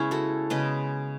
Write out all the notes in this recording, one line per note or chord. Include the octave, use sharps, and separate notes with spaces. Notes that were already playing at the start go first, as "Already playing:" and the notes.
Already playing: C#3 G#3 B3 C#4 E4
F#4 A4
C#3 G#3 B3 B4 D#5